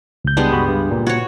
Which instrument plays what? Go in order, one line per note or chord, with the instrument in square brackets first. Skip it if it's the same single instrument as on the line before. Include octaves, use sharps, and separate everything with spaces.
[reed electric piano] C#2 G6
[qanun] G3 G#3 B3 [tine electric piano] D4
[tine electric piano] G2 F#4 B5
G2
A#2
[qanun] F#4 C#5